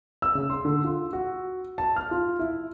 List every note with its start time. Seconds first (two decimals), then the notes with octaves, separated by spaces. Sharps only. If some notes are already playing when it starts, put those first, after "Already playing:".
0.22 E6
0.35 C#3
0.50 C6
0.65 D3
0.84 F4
1.13 F#4
1.78 A5
1.96 F6
2.11 F4
2.39 E4